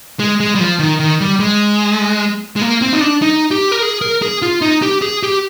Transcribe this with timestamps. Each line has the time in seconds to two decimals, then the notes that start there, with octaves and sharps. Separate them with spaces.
0.19 G#3
0.40 G#3
0.55 G3
0.60 F3
0.79 D#3
1.00 D#3
1.21 G3
1.40 G#3
2.56 G#3
2.62 A#3
2.82 C4
2.93 D#4
3.01 D4
3.22 D#4
3.51 G4
3.72 A#4
3.82 G#4
4.01 A#4
4.22 G#4
4.42 F4
4.62 D#4
4.82 G4
5.02 G#4
5.23 G4